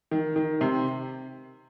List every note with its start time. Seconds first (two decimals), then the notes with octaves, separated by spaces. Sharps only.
0.11 D#3
0.36 D#3
0.61 C3